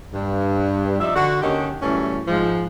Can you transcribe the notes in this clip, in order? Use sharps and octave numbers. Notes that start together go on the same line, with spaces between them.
G2
C3 F3 D#4 D5 E5
D3 F#4
D#2 D3 D#3 C#4 D#4 G4
F#2 A2 E3 G3 A3 C#4
G#2 F3 G#3